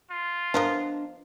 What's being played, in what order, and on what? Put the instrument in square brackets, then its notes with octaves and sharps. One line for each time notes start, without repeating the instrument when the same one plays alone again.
[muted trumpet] F4
[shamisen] F3 B3 A#4 [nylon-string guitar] D4 D#5